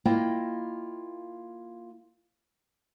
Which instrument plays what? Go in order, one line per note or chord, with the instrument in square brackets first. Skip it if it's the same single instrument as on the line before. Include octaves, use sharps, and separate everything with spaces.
[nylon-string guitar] A#3 E4 F4 D#5 G5